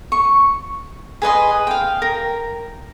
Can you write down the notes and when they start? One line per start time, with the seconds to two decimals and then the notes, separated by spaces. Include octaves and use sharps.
0.12 C#6
1.22 G#4 B4 D#5 C6
1.67 F5 G5
2.02 A#4